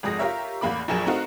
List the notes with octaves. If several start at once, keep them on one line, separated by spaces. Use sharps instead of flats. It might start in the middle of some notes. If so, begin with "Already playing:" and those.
G#1 F2 G#3 D#6 A#6
F4 G4 A#4 C#5 E5
A1 E2 A#3 B5 D6
A#1 F2 F#3 G#4 A#4 E7
A3 C4 D#4 F#4 A#4 F5